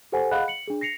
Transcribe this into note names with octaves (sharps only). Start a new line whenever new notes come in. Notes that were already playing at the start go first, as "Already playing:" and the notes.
G4 A4 C5 F#5 G#5
G#4 D#5 F5 F#5 B5 F#6
C#7 F#7
D4 G#4
A#6 C7 C#7 F7